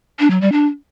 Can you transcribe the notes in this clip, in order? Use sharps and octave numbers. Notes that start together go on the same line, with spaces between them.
D4
F#3
G3
D4